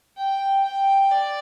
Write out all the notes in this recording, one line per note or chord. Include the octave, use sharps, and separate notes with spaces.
G5
G5
D5